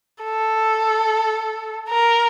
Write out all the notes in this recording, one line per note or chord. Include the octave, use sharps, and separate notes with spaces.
A4
A#4